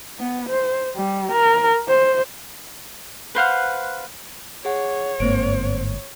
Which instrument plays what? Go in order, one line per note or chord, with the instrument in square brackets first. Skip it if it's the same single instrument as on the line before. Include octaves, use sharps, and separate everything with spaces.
[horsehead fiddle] B3
C5
G3
A#4
C5
[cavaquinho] B4 C5 F5 F#5
[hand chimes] G#4 F#5 [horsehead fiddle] C#5
[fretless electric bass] G1 G#2 A#3 [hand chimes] C4 C5 D7